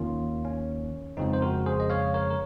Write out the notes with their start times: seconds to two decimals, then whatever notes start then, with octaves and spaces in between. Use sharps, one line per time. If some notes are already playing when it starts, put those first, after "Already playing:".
Already playing: D#2 D#3 A#3 C#4 F4
0.45 C#4
1.17 F2 C#3 F3 G#3 C4 D#4
1.33 C5
1.42 F#4 A#4
1.66 G#4 C5
1.80 D#5
1.90 C#5 F5
2.14 A#4 C#5
2.31 A#4